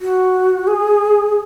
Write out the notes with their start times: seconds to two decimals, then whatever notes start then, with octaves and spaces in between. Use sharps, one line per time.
0.01 F#4
0.67 G#4